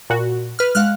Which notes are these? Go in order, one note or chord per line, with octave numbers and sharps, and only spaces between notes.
A#2 F#4
B4 F6
G#3 F5 F#5 F6 F#6